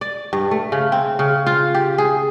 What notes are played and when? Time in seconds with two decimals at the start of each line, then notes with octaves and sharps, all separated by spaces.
0.01 D5
0.33 G2
0.51 A3
0.72 C#3
0.92 C4
1.19 C#3
1.46 F4
1.74 G4
1.98 G#4